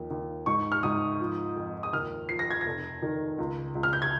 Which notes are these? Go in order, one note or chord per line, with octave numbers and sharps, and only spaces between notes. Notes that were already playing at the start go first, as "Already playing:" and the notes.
Already playing: D#2 F3
D#2
G#2 C#6
F6
G#2 D#6
F3
F2
D#6
D#2 F6
F3 C7
A#6
G#6
A#6
F1
D#3
C#2
C#2
F6
G6
G#6